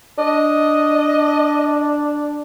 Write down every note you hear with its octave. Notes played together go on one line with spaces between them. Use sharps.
D4 D#5